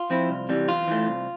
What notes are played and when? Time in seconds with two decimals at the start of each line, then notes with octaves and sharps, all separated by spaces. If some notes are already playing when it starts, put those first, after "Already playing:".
Already playing: F4
0.10 F3 C4 E4
0.29 C2
0.49 C3 E3 G3
0.68 E2 F4
0.88 E3 A3
1.07 C2